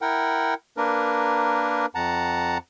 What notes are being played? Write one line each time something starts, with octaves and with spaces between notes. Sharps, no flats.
E4 A#4 F#5 G5
A#3 D4 A#4 B4
F2 F#5 A5 A#5